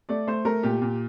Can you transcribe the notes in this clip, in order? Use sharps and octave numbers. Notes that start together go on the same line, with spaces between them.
A3 D5
A3 C5
A3 A#4
A#2 G4
A#2